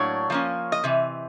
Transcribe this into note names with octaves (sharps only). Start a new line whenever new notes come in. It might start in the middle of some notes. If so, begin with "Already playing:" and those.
Already playing: A2 F#3 A#3 D4 C#5
F3 A#3 C#4
D#5
C3 E3